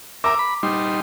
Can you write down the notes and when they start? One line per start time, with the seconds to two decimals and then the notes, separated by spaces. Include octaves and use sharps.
0.24 A#4 E5 A#5 D6
0.39 B5
0.63 G3 D#4 C6